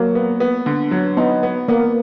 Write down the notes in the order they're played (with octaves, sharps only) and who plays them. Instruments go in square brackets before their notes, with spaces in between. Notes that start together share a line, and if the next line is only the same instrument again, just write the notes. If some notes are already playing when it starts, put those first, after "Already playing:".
Already playing: [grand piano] F#3 [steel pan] A#3
[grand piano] B3
B3
D3
F#3
[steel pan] B3 [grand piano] D#4
[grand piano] B3
[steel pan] A#3 [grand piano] B3